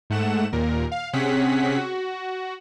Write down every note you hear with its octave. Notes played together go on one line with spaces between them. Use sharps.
G#2 A3 F#5 E7
D#2 A#2 A#4
F5
C3 C4 C#4 G#4 F#5 B6
F#4